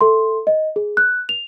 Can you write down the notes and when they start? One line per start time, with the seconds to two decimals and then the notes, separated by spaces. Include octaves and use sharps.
0.01 A4 E5 C6
0.47 D#5
0.76 G#4
0.97 F#6
1.29 F7